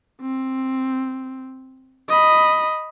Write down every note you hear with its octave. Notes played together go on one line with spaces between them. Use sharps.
C4
D#5 B5